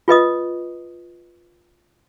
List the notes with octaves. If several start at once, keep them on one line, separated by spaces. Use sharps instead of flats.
F4 B4 D#5 D#6